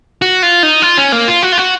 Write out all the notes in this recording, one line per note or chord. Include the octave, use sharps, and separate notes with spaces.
F#4
F4
D#4
F4
C#4
A#3
F4
F#4
F4
F#4